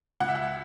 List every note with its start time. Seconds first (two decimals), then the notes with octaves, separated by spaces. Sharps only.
0.20 C#2 F#5
0.28 E5
0.35 F#5